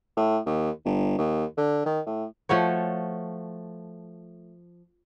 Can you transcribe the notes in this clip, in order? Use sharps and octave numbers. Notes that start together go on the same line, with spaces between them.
A2
D#2
G1
D#2
D3
D#3
A2
F3 A3 F#4 C#5